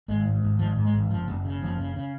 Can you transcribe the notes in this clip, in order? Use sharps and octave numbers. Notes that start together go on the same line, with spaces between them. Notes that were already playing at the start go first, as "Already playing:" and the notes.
G#1 G#3
G#2
G#1
G#2 F3
G#2
G#3
G#1
F#1 F3
F#1
C#3
F#1 F3
C#3
C#3